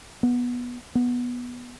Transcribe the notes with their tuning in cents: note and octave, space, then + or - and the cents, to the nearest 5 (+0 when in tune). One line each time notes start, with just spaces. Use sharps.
B3 -15
B3 -10